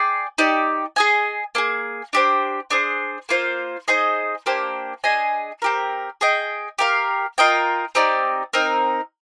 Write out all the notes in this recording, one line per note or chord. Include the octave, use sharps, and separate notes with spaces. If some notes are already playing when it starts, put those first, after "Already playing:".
Already playing: G#4 D5 G5
D#4 G4 D5
G#4 D#5 G#5
A#3 D4 G#4
D4 G4 C5
D4 G#4 C5
A#3 F4 C5 F5
D#4 G#4 C5 D#5
A#3 D4 G4 C5
D4 G#4 D#5 G#5
C4 G4 A#4
G#4 D#5 G5
G4 A#4 F5
F4 A#4 D#5 G5
C4 D#4 G4 D5
C4 D#4 A#4